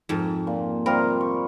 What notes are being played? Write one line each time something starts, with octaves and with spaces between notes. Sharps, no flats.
F2 G#2
A#2
C3 G3 F4 A#4
C#6